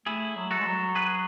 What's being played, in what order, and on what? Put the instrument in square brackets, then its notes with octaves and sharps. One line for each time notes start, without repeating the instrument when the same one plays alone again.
[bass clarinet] A3 [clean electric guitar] E4 G#4
[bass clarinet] F#3
[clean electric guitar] F#4 A4
[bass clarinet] G#3
F#3
[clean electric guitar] G#4 B4